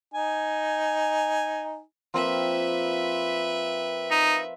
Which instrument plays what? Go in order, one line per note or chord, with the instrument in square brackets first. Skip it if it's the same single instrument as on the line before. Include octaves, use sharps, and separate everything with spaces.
[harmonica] D#4 G#5
[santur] F3 A#3 C4 [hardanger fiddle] B4 E5
[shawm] D#4